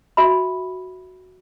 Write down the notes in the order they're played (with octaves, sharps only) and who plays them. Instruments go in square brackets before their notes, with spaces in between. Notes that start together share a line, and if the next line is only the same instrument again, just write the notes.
[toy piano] F#4 E5 B5